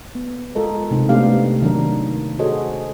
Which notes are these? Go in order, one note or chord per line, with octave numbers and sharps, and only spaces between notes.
B3
G#3 F4 A4 A#4 D#5
C3 G#3 C4 D#4
A3 B3 C4 D4 G4 F5
D#3 F#3 D4 A#4
F#4 G#4 A4 C5 C#5 D#5